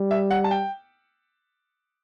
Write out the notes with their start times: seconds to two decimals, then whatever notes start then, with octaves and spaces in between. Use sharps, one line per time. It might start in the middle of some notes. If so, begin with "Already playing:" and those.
Already playing: G3
0.11 E5
0.31 F#5
0.44 A5
0.51 G5